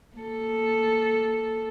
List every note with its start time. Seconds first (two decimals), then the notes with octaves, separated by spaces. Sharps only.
0.17 A#3 A4